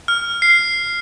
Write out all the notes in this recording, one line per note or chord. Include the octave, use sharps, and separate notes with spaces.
F6
C7